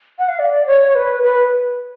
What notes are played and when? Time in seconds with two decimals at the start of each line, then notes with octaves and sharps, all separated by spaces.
0.19 F#5
0.29 F5
0.39 D5
0.67 C#5
0.95 B4
1.23 B4